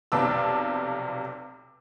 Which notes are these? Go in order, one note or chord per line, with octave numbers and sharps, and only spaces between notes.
F1 B1 C3 A5 D6 E6